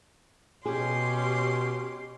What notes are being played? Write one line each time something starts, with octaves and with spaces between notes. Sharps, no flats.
B2 C#4 G4 G#4 C6